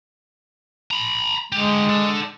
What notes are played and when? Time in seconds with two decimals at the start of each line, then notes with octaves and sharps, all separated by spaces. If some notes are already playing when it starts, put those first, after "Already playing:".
0.91 A#5 B5
1.52 D3 G#3 G4
1.89 D4 A4